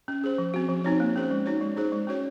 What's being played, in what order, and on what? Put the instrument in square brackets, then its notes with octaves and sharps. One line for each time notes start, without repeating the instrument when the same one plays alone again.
[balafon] C#4
G#4 C5
F3
C4 F#4
F3
C4 D#4 F#4 C#5
A#3
C#4 G#4 C5
G#3
D#4 F#4 C#5
G#3
D#4 G#4 C5
G#3
C#4 F#4 C#5